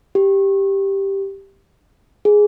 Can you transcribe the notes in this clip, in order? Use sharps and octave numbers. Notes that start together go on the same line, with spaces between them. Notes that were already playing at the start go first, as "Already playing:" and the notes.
G4
G#4